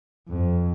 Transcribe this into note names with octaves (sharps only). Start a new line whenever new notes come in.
F2